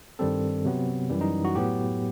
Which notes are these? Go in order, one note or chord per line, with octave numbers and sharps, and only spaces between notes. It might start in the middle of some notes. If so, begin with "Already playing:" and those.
G2 D#3 G3 C4 A4
C3 F#3 B3
F#2 E3 G3
D#4
F#4
A2 F#3 B3 G4